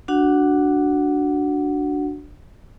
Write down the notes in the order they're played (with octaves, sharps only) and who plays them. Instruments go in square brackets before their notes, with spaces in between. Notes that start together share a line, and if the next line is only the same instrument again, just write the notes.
[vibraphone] D4 F#4 F#5